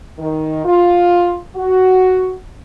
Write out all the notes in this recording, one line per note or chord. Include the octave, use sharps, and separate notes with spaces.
D#3
F4
F#4